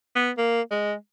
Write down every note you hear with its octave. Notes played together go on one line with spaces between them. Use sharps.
B3
A#3
G#3